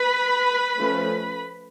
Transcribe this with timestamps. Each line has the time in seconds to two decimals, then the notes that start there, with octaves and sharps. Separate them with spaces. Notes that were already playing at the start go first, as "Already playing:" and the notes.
Already playing: B4 B5
0.78 F3 A3 C#4